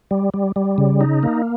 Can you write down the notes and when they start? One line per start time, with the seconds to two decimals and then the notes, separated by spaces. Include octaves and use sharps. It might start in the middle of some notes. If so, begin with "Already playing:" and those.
0.11 G3
0.34 G3
0.56 G3
0.78 C#3
1.01 D#4
1.23 A#3